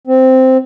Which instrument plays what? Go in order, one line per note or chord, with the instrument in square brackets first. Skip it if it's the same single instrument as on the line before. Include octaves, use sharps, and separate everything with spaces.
[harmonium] C4